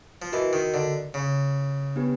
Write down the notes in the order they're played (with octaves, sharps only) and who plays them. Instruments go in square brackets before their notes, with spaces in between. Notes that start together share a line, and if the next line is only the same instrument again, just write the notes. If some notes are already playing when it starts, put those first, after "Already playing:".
[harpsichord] F3
[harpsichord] E3 [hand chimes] F#4 A#4 D#5
[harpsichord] D#3
D3
C#3
[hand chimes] B3 D4 G4 B4